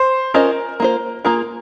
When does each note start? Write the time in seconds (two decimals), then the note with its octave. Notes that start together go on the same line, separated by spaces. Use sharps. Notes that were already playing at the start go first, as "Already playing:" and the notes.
Already playing: C5
0.34 C#4 F4 A#4 C5 D#5
0.80 A#3 F4 C5
1.24 A#3 F4 G#4 A#4